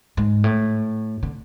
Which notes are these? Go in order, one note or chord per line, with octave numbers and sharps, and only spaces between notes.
G#2
A2
D3